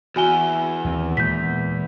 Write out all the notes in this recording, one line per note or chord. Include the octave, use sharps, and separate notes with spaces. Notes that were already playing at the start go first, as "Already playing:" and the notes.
E2 F#4 G#5 G7
D#2 E3 C4
A#2 E3 G#3 G6 B6